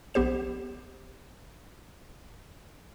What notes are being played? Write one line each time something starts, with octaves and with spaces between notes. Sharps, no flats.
A#1 B3 G4 C5 E7